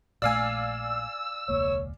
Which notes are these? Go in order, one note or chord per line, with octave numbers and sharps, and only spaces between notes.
A#1 A#2 A3 D5 F5 G#5 E6
E1 C#2 A#3 C#5